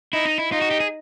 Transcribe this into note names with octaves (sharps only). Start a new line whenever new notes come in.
D#4 E4
D#4
E4
D#4 F4
F#4
G4
G#4